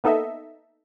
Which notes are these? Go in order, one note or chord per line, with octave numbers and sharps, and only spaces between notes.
A#3 B3 D#4 A4 D#5 E5